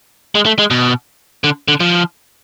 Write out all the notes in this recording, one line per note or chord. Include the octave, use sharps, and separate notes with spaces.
G#3
A3
G#3
B2
D3
D3
F3